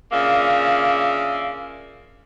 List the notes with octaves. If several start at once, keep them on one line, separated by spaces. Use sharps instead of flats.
C#3 A#3 D4 F4 E5